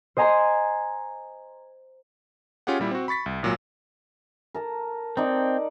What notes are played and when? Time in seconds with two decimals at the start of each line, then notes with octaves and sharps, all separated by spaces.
0.17 C5 D#5 G#5 A#5 C6
2.67 C#4 F4 G4 G#4 F#5
2.80 A#2 G3 E4
2.91 C4 F#4
3.08 B5 C#6 A6 B6
3.26 C2
3.43 G#1 A#2 F#3
4.54 A#4 A5
5.17 C4 D#4 D5